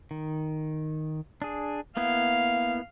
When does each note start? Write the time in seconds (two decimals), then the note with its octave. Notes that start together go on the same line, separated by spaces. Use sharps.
0.11 D#3
1.42 D4 G#4
1.97 A#3 B3 E4 F5